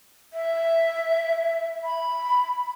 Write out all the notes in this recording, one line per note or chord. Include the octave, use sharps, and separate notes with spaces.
E5
B5